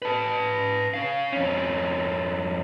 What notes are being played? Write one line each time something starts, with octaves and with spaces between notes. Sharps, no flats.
B4 A5
C#4 F5
F2 C#4